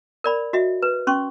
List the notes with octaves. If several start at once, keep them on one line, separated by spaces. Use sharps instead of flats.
A#4 D5 B5
F#4 D#5 E5
B4
C#4 C6 C#6